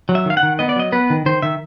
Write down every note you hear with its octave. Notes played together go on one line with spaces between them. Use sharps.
F#3
E5
D#3 F5
F#5
D#3
B3 D#5
D5
F#3 D#5
B3 B4
D#3
D#3 C5
D#3 E5